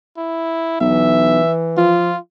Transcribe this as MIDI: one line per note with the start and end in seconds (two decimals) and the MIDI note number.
0.17 0.77 64
0.80 1.40 35
0.80 1.96 52
0.80 1.53 76
1.77 2.13 53
1.77 2.18 65